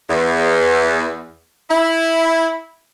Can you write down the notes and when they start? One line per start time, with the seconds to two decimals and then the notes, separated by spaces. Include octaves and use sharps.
0.10 E2
1.70 E4